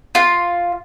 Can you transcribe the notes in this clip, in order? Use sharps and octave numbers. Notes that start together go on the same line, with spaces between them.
F4 F5